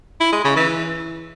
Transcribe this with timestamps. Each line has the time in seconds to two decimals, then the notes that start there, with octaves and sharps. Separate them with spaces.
0.20 E4
0.32 G#3
0.44 C#3
0.56 E3